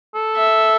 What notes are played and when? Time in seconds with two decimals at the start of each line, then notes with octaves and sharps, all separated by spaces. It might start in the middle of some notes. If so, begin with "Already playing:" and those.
0.15 A4
0.36 E5